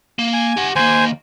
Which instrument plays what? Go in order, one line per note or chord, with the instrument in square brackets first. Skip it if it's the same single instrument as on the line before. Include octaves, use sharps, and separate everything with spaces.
[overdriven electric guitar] A#3
[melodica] G#5
[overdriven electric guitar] G4 F#5
[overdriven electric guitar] D#2 A#3 [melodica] C5 G#5